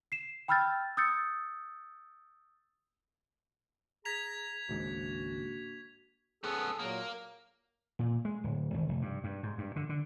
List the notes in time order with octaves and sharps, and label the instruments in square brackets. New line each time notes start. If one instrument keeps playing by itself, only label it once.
[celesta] C7 E7
G5 B5 E6 F6 G6 A6
D#6 E6 G6 A6 C#7
[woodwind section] G#4 A#5 [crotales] G#6 B6 F7
[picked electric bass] G#1 C#2 G#2 [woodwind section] A#3 D4 F#4
[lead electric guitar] B3 C#4 [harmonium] G#4 A4
[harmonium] A#2 F#3 [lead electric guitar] A#3
[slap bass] A#2
G#3
D1
G#1
F1
G2
G2
G#2
G2
D3
D3